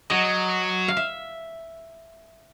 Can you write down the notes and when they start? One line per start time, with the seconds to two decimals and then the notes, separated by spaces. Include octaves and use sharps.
0.10 F#3 D#5
0.88 F5
0.97 E5